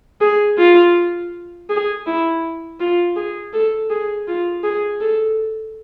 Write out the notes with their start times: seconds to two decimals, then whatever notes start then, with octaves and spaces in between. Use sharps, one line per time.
0.21 G#4
0.58 F4
1.69 G#4
2.06 E4
2.80 F4
3.16 G#4
3.53 A4
3.90 G#4
4.27 F4
4.64 G#4
5.01 A4